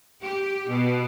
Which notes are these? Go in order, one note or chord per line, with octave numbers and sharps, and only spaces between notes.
G4
B2